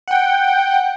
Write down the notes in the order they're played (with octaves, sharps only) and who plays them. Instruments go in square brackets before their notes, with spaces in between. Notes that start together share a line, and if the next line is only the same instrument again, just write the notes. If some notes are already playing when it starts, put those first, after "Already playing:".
[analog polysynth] F#5 G5